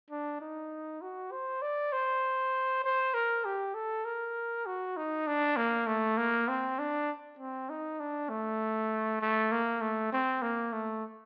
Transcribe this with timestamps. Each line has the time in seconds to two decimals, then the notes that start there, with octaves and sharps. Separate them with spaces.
0.10 D4
0.41 D#4
1.02 F#4
1.32 C5
1.62 D5
1.93 C5
2.84 C5
3.14 A#4
3.45 G4
3.74 A4
4.05 A#4
4.66 F#4
4.97 D#4
5.27 D4
5.57 A#3
5.87 A3
6.17 A#3
6.48 C4
6.79 D4
7.39 C4
7.70 D#4
8.00 D4
8.29 A3
9.22 A3
9.52 A#3
9.81 A3
10.13 C4
10.42 A#3
10.73 A3